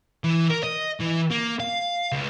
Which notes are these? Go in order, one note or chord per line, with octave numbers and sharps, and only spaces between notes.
E3
A#4
D#5
E3
A#3
F5
C#2